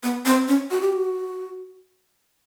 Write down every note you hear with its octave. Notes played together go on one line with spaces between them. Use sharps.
B3
C4
C#4
F#4
G4
F#4